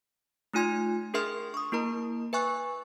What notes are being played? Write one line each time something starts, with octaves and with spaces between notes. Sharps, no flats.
A3 D#4 F4 G#5 C6 G#6
D4 G#4 A#4 E5 C6 F6
C#6 D#6
A#3 E4 A#4 A#5
B4 E5 G#5 C#6 F#6